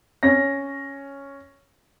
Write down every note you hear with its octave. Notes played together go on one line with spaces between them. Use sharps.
C#4 A#6